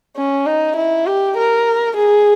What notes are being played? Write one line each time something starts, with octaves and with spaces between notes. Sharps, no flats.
C#4
D#4
E4
G4
A#4
G#4